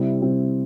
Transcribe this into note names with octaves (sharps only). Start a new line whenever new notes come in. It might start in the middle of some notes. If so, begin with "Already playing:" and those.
Already playing: C3 G3 C4 E4
C3 G3 C4 E4